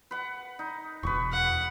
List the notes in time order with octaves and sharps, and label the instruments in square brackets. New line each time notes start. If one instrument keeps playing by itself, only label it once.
[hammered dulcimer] B4 F#5
D#4
[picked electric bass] E1 [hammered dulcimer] B4 C#6
[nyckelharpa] F#5